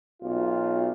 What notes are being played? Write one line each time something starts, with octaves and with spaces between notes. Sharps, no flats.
B1 F4